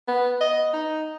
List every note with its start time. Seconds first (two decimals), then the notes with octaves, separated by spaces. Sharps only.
0.08 B3
0.41 D#5
0.73 D#4